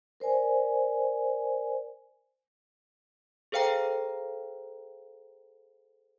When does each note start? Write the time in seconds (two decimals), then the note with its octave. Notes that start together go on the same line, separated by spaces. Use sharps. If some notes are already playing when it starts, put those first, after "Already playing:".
0.20 A#4 C5 D5 G#5
3.52 G#4 A4 C5 F5 G5 A#5